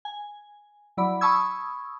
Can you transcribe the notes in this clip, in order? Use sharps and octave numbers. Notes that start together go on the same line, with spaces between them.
G#5
F#3 E4 D5 B5
A5 B5 C#6 D#6 E6 G#6